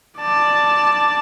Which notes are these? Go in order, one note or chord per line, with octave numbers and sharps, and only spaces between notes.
D5 A5